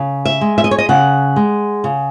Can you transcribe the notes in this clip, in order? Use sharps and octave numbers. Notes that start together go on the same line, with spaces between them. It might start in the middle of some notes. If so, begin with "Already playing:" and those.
Already playing: C#3
E5
G#3
E5
D#5
C#5
D#5
C#3 F#5
G#3
C#3